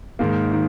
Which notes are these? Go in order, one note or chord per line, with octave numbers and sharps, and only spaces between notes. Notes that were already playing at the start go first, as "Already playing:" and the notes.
G#2 D#3 A#3
D#3